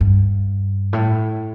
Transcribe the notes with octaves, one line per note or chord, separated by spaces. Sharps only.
G2
A2